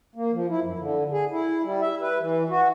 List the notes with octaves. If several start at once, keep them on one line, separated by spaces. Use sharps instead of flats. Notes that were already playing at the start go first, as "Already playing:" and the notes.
A#3
F3
E4
F#2
D3
G#4
E4
G3
E5
B4
E3
F#4